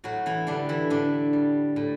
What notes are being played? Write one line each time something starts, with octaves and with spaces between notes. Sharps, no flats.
A2 F#3 F#4
E3 E4
D3 G3 D4
E3 E4
A2 D3 D4
G3
A2